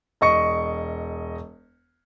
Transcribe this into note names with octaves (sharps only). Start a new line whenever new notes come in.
E1 D#5 C#6 C#7